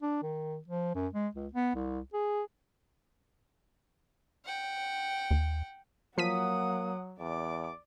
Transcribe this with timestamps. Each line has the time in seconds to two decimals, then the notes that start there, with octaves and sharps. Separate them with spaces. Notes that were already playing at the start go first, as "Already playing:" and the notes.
0.02 D4
0.22 D#3
0.67 F3
0.95 F#2
1.13 G#3
1.35 C#2
1.53 B3
1.75 C2
2.13 G#4
4.45 F#5 G5
5.31 D#2
6.18 F3 F#3 A#3 F#5 D#6 B6 D#7
7.19 E2 D5 D6